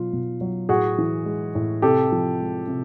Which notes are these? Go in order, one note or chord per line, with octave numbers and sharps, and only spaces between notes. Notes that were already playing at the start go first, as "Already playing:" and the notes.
Already playing: B2 F#3 F4
B2
F#3
A2 F#4 G#4
E3
G#3
A2
C3 G4 A4
F3
G#3
C3